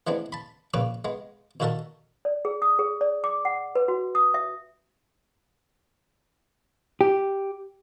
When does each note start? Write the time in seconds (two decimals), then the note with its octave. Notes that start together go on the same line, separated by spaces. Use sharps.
0.07 E3 G#3 A3 B3 C4 D4
0.32 A5 B5
0.74 A#1 A#2 C#3 B4 C#6 D6
1.05 G#3 B3
1.60 A#2 D#3 F#4 A4 A#4 A5
2.25 D5
2.45 G#4
2.62 D#6
2.79 G#4
3.01 D5
3.24 D6
3.45 F#5
3.75 B4
3.88 F#4
4.15 D#6
4.34 E5
7.01 G4